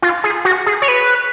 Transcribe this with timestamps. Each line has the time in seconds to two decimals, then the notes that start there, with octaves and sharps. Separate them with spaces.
0.02 F4
0.24 G#4
0.45 F#4
0.66 G#4
0.82 C#5
0.88 B4